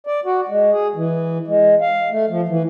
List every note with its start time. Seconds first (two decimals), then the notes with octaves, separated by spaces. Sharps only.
0.07 D5
0.25 F#4
0.49 G#3
0.72 G#4
0.96 E3
1.48 G#3
1.81 F5
2.11 A3
2.29 F3
2.49 E3